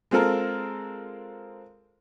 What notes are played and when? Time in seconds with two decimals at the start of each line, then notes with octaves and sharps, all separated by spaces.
0.11 G#3 C4 F4 A4 A#4